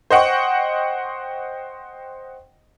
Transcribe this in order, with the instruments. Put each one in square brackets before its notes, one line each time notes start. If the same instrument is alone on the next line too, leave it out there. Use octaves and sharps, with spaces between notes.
[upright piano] C5 D#5 F#5 G5 C#6